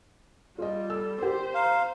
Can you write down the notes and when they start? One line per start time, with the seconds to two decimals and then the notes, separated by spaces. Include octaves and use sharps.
0.58 G3 F4 G#4 D5 D#5
0.90 A4 E6
1.21 G4 A#4 C5
1.55 F5 A#5